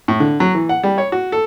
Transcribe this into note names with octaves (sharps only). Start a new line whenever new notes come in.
A2
D3
F#3
E3
F#5
G3
C#5
F#4
A4